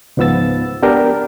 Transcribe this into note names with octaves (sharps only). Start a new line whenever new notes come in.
C#2 G#2 F3 B3 E6 A6
B3 D4 G4 A#4